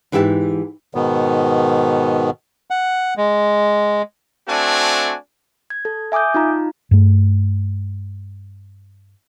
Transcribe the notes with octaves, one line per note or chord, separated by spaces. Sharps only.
G#2 E3 G4 E5 G5 A5
G#2 B2 D#3 B3
F#5
G#3
A3 C4 D4 F#4 G#5
G#6
A4
E5 G#5 D6 D#6 G6
D#4 F4 A#5
G2 A3